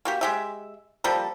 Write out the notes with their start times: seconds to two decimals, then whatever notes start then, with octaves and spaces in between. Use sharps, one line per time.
0.05 A#3 F#4 G4
0.21 G#3 G4 E5
1.04 F3 G3 A#3 A4